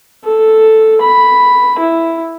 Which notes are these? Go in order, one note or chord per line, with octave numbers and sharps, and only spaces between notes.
A4
B5
E4